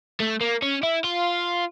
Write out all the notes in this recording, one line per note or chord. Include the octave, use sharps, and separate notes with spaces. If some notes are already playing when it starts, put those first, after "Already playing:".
A3
A#3
C#4
E4
F4